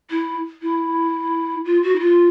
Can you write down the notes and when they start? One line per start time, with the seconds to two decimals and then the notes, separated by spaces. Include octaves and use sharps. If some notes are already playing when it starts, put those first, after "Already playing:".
0.11 E4
0.62 E4
1.65 F4
1.83 F#4
1.95 E4
1.99 F4